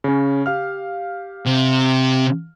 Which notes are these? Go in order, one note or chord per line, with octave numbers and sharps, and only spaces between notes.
C#3 C#4
G4 F5 F6
C3